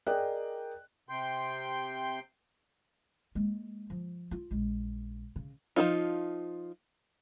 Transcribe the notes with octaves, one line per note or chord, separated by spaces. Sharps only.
G#4 A#4 D5 D#5 G5 F#6
C3 G5 C6
G#3 A#3
F3
F4
A#1 G#3
C#3
F3 F#3 D#4 F4